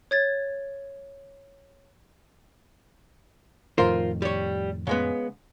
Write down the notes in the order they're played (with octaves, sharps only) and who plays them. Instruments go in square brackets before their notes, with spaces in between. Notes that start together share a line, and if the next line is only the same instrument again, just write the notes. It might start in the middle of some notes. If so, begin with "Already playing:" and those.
[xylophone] C#5 G#6 A6
[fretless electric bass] F2 A2 D#3 [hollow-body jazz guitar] F4 A#4 C5
[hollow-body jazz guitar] G3 C#5
C#3 G#3 B3